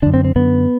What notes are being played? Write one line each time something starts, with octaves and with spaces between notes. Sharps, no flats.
F#2 D3 D4
C4
C4
F#2 D3 B3